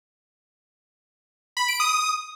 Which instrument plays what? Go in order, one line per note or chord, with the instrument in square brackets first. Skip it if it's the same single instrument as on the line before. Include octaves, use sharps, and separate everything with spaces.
[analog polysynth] B5
D7
D#6